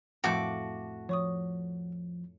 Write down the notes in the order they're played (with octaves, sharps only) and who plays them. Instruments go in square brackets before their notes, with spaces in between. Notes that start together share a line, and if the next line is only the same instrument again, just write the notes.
[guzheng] F2 A2 A3 [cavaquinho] F#4 D6
[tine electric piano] F3 [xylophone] C#5 C#6 D#6